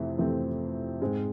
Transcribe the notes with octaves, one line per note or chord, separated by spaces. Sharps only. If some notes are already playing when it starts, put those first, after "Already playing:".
Already playing: F2 C3 E3 A3 C4
F2 C3 E3 A3 C4
G#2 G#3 C4